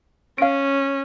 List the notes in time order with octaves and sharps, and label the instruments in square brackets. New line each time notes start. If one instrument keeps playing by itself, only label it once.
[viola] C#4 [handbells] F5 D7